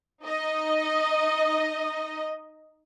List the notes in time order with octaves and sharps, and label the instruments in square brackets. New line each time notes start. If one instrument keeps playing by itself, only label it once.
[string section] D#4 D#5